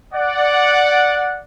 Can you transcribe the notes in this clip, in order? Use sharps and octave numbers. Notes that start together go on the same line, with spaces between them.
D5 F#5